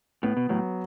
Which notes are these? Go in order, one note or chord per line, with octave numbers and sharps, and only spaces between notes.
A2 B3
B2
A2 F#3